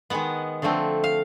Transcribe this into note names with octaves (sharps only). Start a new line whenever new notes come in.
D#3 G#3 B3 F#5
D3 F3 A3 C4
F5